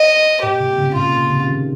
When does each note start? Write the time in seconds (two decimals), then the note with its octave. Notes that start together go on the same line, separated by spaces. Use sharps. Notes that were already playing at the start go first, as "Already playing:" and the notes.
Already playing: D#5
0.42 A#2 G4
0.60 C3
0.78 C#3
0.95 A#2 F4
1.13 C3
1.30 C#3
1.48 D#3